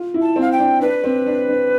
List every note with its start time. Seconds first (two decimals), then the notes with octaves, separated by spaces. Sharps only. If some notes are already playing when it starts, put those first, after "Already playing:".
Already playing: F4
0.14 E4
0.22 A5
0.36 C4
0.41 F5
0.52 G5
0.59 D4
0.81 D4 B4
1.04 C4
1.26 D4
1.48 D4